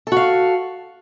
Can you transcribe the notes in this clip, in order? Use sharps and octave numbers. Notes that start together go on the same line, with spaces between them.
F#4 A4 F5